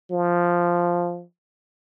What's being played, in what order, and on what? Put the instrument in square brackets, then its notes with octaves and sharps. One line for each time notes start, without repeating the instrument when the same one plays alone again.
[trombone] F3